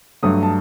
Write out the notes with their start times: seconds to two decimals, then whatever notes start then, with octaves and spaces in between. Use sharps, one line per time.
0.23 G2 F#3 A3 D#6
0.43 A5